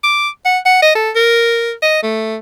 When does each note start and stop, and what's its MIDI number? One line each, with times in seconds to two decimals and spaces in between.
0.04 0.29 86
0.45 0.58 78
0.66 0.79 78
0.82 0.93 75
0.95 1.10 69
1.15 1.73 70
1.82 2.02 75
2.03 2.37 57